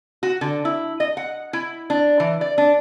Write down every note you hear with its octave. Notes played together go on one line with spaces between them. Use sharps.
F#4
D3
E4
D#5
F#5
E4
D4
E3
D5
D4